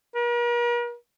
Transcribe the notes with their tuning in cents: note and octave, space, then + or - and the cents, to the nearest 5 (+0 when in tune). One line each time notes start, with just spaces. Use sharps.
A#4 +45